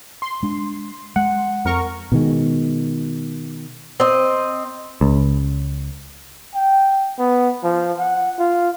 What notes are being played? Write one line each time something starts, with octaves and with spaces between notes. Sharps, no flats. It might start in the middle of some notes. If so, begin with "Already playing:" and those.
C6
G#3 D4
G#3 F#5
F2 A#4 C#6
B2 D#3 G#3
C4 D#5
C#2
G5
B3
F3
F#5
F4